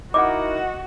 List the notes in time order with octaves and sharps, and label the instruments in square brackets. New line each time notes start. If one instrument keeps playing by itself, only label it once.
[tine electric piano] D#4 E4 A#4 [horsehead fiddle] F#4 [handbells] D#5 F#5 [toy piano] D6